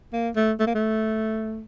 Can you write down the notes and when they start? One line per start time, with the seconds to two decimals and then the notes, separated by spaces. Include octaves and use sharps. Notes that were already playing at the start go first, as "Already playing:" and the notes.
0.13 A#3
0.36 A3
0.59 A3
0.67 A#3
0.75 A3